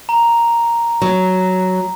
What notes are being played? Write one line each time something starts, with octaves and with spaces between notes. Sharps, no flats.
A#5
F#3